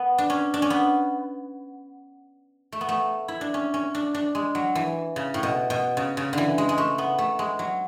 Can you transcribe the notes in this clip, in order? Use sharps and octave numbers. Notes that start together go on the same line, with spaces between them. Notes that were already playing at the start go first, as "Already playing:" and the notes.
Already playing: B3
D4
C#4
D4
C#4
B3
A3
B3
A3
E4
D4
C#4
C#4
D4
D4
G#3
F#3
E3
C#3
A2
B2
B2
C#3
C#3
D3 E3
G#3
G#3
A3
B3
A3
G#3
F#3